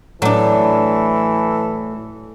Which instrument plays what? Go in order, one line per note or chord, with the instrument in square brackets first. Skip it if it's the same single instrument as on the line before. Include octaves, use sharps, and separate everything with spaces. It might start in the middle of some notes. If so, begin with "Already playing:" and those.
[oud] A2 [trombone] E3 [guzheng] F#3 D4 [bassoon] A4